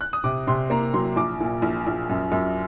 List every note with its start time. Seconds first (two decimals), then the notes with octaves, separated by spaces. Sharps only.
0.01 F#6
0.13 D#6
0.24 C3 D6
0.47 C3 C6
0.70 A#3 A#5
0.94 F#3 C6
1.16 A#1 D6
1.40 A#2
1.62 A#1
1.87 A#1
2.10 F#2
2.32 F#2